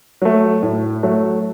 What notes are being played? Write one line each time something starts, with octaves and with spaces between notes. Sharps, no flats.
F#3 A3
A2
F#3 A3